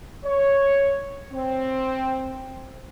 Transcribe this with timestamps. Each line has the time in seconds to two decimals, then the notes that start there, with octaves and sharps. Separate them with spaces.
0.24 C#5
1.32 C4